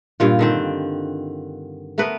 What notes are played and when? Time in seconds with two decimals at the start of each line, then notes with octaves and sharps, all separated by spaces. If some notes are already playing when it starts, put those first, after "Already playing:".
0.20 G2 A#2 F4
0.39 D3 D#3 C4
1.98 A3 B3 A#4 B4